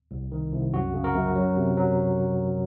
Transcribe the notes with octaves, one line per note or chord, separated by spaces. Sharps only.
C2
D#3
C2
F#2 F#4
C#3
F#4 A#4
F#2
F#3
C3
F#3